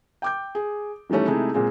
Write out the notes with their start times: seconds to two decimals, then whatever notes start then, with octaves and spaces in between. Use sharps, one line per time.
0.22 G5 D6 G6
0.55 G#4
1.09 D#3 E3 G3 A3 C#4
1.27 C3 G#3 A3 D#4 E4 G#4
1.54 A#2 G#3 C4 G#4